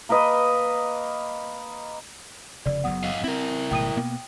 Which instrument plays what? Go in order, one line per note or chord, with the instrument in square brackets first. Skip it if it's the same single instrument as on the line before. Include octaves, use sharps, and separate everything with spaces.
[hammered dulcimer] A#3 A#4 B4 D#5
[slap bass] F1 C#3 [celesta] D5
[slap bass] F#1 F#3 B3 [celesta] F#5 D#6
[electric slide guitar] F#2 D#5 F5
[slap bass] C4 [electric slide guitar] E4 A#4
[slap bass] G#1 B2 A3 [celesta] G5 D#6 D#7
[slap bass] B2 A#3 B3